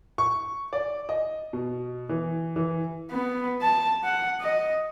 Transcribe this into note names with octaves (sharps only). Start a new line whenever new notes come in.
C#6
D5
D#5
B2
E3
E3
B3
A5
F#5
D#5